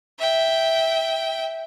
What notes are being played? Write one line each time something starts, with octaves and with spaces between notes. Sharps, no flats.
E5 G5